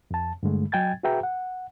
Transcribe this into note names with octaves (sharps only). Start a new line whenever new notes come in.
F2 A5
G2 D3 G#3 A3
F#3 D#5 G5 G#5 G#6 A6
F#4 G#4 B4 E5 G5 A#5
F#5